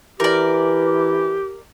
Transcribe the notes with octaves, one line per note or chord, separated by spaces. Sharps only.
E3 G4 A#4 D5